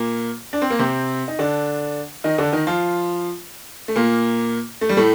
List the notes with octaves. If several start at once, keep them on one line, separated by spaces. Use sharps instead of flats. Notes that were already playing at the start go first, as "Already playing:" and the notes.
Already playing: A#2 A#3
D4
C4
A#3
C3 C4
D#4
D3 D4
D#3 D#4
D3 D4
D#3 D#4
F3 F4
A3
A#2 A#3
A3
G3
A2 A3